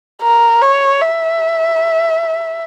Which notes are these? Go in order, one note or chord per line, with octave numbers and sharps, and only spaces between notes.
A#4
C#5
E5